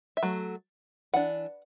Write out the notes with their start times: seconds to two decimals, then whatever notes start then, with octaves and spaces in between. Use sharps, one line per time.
0.17 E5
0.23 F#3 A3
1.14 E3 D4 F#5